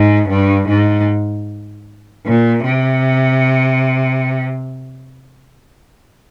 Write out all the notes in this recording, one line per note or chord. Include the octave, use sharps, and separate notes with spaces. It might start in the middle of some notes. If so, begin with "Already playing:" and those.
Already playing: G#2
G2
G#2
A#2
C3